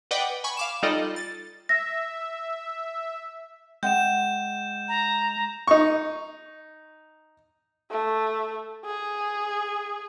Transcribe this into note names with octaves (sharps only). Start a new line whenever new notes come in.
B4 D5 D#5 F#5 G5 D6
G#5 B5 C#6
F5 D6 E7
G3 D#4 F4 A4 D5 D#5
A6
E5 A#6
G#3 E5 F#5 G5 G6 E7
A#5
D#4 C#6
A3
G#4